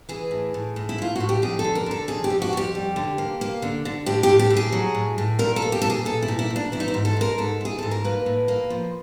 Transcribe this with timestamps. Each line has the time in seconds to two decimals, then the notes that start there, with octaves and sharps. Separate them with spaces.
0.09 E3 G#4
0.31 A2
0.54 A2
0.76 A2
0.89 E4
0.98 A2 F4
1.16 A2 F#4
1.29 G4
1.42 F2 G#4
1.59 A4
1.64 D3
1.75 A#4
1.86 D3 A4
2.08 F2 G#4
2.24 G4
2.30 F2
2.42 F#4
2.53 F2 G4
2.75 G3
2.96 D3
3.18 A#3
3.41 A#3
3.62 D3
3.85 D3
4.06 A2 G4
4.23 G4
4.29 A2
4.39 G4
4.50 A2
4.57 G#4
4.73 F#3
4.95 A2
5.18 A2
5.39 A#2 A#4
5.56 A4
5.62 A#3
5.72 G4
5.82 A#2 A4
5.90 G#4
6.05 A#2 A4
6.23 E4
6.28 A#2
6.39 E4
6.50 A#2
6.56 D4
6.72 E3 E4
6.80 D#4
6.88 E4
6.94 G#2
7.05 A4
7.17 G#3 A#4
7.38 G#2 A4
7.61 E3 G#4
7.79 G#2 A4
7.91 A#4
8.04 A#3 B4
8.26 A2
8.48 A#3
8.70 F3